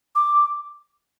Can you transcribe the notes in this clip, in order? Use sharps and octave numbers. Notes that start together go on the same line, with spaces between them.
D6